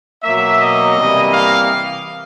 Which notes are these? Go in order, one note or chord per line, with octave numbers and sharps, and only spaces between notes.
B2 F#3 A#3 E5
D#5
C3 E3 G3 A#3
F5